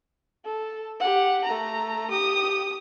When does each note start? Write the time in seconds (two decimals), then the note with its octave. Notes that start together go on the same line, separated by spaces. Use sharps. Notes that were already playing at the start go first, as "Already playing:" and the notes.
0.45 A4
1.00 G4 F#5
1.45 A3 A#5
2.10 G4 D#6